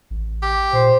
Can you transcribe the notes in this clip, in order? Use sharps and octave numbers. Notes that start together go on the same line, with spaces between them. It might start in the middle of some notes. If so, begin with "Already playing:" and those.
A1
G4
A#2 C5